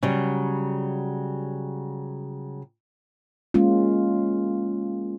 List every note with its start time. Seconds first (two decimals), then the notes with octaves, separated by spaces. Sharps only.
0.03 C#3 F#3 G3
3.54 G#3 A#3 C#4 F4